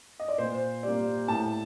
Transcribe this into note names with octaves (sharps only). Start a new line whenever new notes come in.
D#5
D5
A#2 C5
G3 A#3 D5
A2 A5